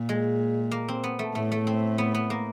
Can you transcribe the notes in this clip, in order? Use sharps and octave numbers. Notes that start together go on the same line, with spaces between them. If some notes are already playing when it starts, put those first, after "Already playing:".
Already playing: A#2
G#3
A#3
C4
B3
A3
A2 A3
A3
C4
B3
B3
A#3